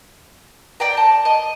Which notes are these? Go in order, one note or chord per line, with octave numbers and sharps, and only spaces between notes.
D5 G5 A#5
A5
D#5